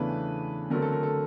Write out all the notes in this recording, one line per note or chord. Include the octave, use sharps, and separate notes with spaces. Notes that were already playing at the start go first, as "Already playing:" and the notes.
Already playing: E2 C#3 E3 A3 D4 B4
D3 F#3 A3 C4 A#4
A4
A#4
A4